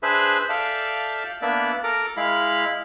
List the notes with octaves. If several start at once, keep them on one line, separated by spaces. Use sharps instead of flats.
D4 G#4 B4 C5 E5 B5
A4 D5 E5 F5 G5 A5
A#3 B3 D4 D5 E5
A4 A#4 A#5 D6
G#3 E4 F5 B5